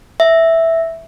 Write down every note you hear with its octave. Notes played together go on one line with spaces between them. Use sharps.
E5